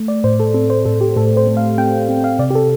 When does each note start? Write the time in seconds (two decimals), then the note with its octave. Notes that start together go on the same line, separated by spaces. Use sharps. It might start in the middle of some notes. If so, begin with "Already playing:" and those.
Already playing: A3
0.08 D5
0.24 A2 C5
0.40 A4
0.54 C4 A4
0.70 C5
0.85 A2 A4
1.01 G4
1.16 A2 A4
1.37 C5
1.47 A3
1.57 F5
1.78 C4 G5
2.09 C4
2.24 F5
2.39 C3 D5
2.51 G4
2.55 A4